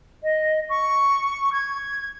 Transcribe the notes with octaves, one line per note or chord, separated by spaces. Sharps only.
D#5
C#6
G#6